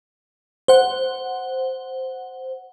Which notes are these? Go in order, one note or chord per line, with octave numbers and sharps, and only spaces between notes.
C5 F#5